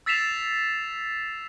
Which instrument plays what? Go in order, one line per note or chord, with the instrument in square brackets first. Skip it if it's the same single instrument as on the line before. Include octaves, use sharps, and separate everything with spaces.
[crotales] E6 A6 B6 C7 E7 F7